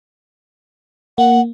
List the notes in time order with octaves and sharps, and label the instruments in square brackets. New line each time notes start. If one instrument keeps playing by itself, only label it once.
[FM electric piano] A#3 [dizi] F#5